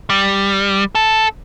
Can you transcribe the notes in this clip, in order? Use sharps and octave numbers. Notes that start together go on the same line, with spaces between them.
G3
A4